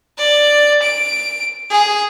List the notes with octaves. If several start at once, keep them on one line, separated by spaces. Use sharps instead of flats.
D5
D7
G#4